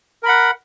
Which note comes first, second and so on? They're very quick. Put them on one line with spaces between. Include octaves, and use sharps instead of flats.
A#4 B5 F#5